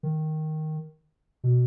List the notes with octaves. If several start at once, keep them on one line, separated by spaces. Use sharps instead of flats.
D#3
B2